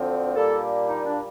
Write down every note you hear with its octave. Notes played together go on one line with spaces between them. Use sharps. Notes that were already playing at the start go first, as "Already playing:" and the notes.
Already playing: D2 D3 F3 C4
A#2 G3 A#3 D4 A4
D#4
D4